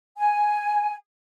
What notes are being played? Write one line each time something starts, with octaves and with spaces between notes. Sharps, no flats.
G#5